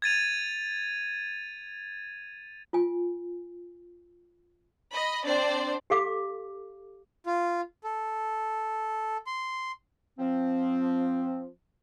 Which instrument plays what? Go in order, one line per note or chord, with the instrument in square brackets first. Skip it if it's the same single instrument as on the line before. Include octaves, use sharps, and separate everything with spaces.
[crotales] G#6 A6 D#7 F7
[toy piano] F4 G#5
[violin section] D#5 B5
C4 D4 C5 D5
[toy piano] G4 A4 F5 D6
[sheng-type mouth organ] F4
A4
C6
[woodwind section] F3 C4